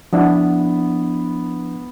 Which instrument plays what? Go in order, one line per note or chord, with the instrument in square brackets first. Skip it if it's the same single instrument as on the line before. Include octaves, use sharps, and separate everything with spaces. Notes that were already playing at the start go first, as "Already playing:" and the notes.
[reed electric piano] F3 D4 E4 [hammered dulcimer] B3